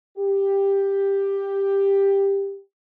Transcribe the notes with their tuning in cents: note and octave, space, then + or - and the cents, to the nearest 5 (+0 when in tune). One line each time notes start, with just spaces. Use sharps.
G4 +10